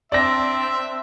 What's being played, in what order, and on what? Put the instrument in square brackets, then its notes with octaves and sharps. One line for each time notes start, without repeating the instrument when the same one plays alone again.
[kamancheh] C4 D4 [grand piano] D5 A#6 [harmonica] E5